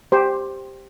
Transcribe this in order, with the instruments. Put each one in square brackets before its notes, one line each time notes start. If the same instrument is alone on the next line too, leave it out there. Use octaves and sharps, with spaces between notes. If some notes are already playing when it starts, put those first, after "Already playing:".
[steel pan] G4 C5